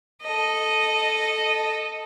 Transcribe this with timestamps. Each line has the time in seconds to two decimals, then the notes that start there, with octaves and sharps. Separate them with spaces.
0.23 A4 D#5